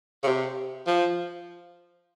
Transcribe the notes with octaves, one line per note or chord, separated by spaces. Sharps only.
C#3
C3
F3